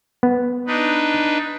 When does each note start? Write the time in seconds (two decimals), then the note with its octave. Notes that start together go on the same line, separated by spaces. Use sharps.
0.23 B3
0.67 D4 D#4 B4